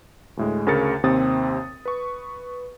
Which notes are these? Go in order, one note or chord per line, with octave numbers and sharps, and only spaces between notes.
D2 A2 G#3
D2 C#3 A#4 A6 C#7
D#2 C3 C4 D#6 A6
B4 C#6